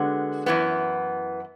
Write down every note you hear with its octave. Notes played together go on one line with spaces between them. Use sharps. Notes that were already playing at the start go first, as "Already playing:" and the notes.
Already playing: D3 G#3 B3 F#4
F#2 E3 B3